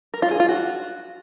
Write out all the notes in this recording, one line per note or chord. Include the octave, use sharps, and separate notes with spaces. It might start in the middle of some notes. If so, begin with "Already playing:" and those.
A#4
F4
G#4
F4
F#4